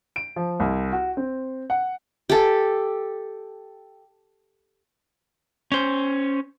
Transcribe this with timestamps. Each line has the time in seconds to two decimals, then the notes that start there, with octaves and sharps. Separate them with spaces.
0.16 D7
0.36 F3
0.60 C2
0.92 F#4
1.17 C4
1.70 F#5
2.30 G4 A4
5.72 C#4 C5